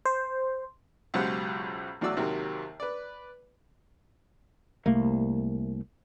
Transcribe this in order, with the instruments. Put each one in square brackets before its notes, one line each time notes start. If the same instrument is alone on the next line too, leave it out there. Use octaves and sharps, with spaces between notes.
[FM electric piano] C5
[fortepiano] C#2 F#2 B2 G4 C5 F#5
E2 A2 F#3 F#4 D5 E6
D#2 C3 F#3 A#4
B4 D5
[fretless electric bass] C2 A3 A#3